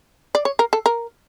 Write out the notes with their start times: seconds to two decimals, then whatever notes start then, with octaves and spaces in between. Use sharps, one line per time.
0.35 D5
0.45 C#5
0.59 A#4
0.73 A4
0.86 A#4